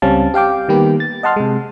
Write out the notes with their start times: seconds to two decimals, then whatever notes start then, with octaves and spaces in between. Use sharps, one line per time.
0.02 C#2 G3 C4 C#4 F5 A5
0.34 G4 F5 G5 D6
0.68 D#3 G3 A#3 B3 G4 B4
1.00 A6
1.23 D#5 F#5 A5 C6 F6
1.36 C3 G#3